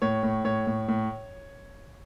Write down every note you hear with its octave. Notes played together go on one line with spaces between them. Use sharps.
A2 C#5
A2
A2 C#5
A2
A2